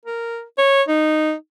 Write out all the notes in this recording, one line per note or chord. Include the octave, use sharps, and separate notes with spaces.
A#4
C#5
D#4